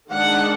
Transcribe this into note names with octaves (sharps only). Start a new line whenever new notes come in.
D#3 G#3 D4 F#5